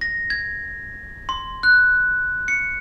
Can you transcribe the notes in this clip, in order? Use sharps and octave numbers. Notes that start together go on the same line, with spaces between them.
A#6
G#6
C6
F#6
C#7